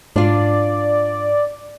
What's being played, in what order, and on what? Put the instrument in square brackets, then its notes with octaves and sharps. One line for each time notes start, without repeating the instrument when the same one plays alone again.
[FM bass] G#2 [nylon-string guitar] D4 F4 [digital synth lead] D5